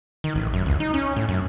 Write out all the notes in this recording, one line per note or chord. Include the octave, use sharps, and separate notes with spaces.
D#3
A1
F#2
C#2
D#4
C#4
A2
F#2